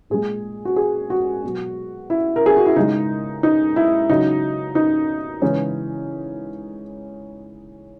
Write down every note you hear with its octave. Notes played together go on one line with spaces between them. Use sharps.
A#2 G#3 G#4
F#4
G#4
F#4
B2 F#3
E4
A#4
G#4
F#4
E4
C#3 G#3 D#4
D#4
E4
C#3 F#3 D#4
D#4
C#3 E3 G#3 C#4